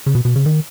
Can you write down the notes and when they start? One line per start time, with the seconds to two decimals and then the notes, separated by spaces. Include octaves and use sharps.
0.06 C#3
0.15 B2
0.25 B2
0.36 C#3
0.46 D#3